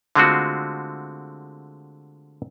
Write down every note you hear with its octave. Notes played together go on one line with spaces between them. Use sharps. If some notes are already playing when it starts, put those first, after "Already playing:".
D3 G#3 A3 C4 F4 F#4